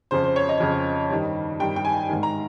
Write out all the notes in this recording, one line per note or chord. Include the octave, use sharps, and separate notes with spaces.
F2 C#3 C5
C5
C#5
D#5
F2 C#3
G2 D#3
G2 D#3 G5
G5
G#5
G#2 D#3
A#5